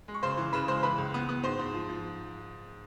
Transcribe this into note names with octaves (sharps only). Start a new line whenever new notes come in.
G#3
C#6
C#3 C5 C6
E3
C#3 B4 B5
G#3 C5 C6
E3 B4 B5
C#2
B3
B3
G#2 C5 C6
G#2
F3
F3